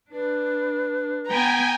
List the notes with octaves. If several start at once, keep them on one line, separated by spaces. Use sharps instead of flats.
D4 B4
B3 G5 G#5 A#5